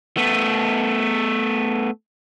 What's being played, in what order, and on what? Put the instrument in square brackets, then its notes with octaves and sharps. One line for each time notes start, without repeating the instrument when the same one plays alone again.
[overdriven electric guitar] A3 B3